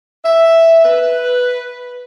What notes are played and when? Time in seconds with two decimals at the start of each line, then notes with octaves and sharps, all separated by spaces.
0.25 E5
0.85 B4